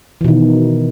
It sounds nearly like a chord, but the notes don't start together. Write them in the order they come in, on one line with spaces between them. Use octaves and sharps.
E3 B2 D#3